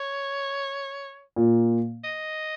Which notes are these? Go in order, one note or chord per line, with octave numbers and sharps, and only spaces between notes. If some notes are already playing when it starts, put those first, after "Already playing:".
Already playing: C#5
A#2
D#5